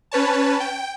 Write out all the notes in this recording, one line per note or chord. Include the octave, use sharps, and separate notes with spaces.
C#4 B4 C#5 A5
G5